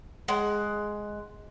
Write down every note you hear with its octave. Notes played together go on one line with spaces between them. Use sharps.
G#3 F#5